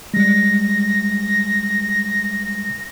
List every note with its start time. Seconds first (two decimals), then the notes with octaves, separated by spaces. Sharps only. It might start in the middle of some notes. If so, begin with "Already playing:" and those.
0.14 G3 G#3 A#6